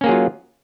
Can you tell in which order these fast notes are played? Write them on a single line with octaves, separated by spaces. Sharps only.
C#4 A#3 G#4 F#3 F4